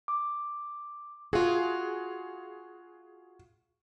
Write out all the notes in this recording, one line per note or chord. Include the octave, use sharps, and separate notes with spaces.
D6
F4 F#4 G#4